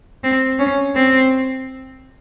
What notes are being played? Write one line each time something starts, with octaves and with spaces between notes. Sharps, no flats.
C4
C#4
C4